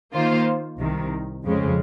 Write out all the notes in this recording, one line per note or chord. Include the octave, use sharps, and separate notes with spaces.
D#3 A#3 F4 C5
C2 C3 D#3
F2 C#3 G#3